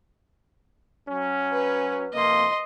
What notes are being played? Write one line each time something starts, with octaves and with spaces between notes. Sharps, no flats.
F#3 C#4
B4
C3 F3 A#3 D#5 C6